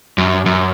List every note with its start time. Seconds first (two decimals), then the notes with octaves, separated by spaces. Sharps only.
0.18 F#2
0.46 F#2